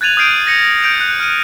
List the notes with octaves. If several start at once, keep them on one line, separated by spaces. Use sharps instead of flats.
F#6 G#6 A6 D#7 F7 F#7
D#6 F6 G6 C7 D7 D#7
A6 A#6 C#7
G6 D7 F7
F#6
F6 D#7